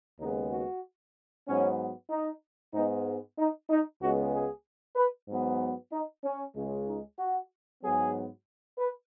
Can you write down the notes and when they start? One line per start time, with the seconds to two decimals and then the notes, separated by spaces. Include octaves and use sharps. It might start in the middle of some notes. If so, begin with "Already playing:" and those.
0.19 D#2 C#3 G#3 B3 D#4
0.51 F#4
1.47 G#2 F#3 B3 C#4
2.10 D#4
2.73 G#2 G#3 B3 D#4
3.37 D#4
3.69 D#4
4.01 C#2 C#3 G#3 B3 F#4
4.33 G#4
4.96 B4
5.28 G#2 F#3 B3
5.92 D#4
6.23 C#4
6.56 C#2 C#3 G#3
6.87 D#4
7.19 F#4
7.82 G#2 F#3 B3 G#4
8.78 B4